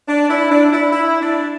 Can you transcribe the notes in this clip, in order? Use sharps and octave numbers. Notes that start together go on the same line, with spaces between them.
D4
E4
D4
E4
E4
D4